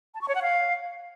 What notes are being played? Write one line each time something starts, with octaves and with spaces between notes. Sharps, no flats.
A5
C#6
C#5
F#5
F5